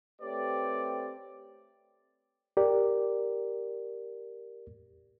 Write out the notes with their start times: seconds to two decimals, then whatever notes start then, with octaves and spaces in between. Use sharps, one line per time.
0.21 A3 C4 G4 B4 C#5 D5
2.57 G4 A#4 D5